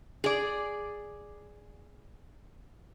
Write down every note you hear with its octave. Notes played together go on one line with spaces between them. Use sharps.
G#4 D5